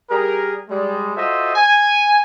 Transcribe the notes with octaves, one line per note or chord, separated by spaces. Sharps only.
G3 G4 G#4 A#4
G3 G#3
F4 F#4 A4 C5 D#5 E5
G#5